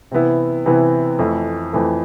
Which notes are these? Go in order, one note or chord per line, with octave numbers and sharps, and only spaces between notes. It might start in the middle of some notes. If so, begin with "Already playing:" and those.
C3 E3 B3 E4
C3 E3 B3 E4
F2 E3 A3
F2 E3 A3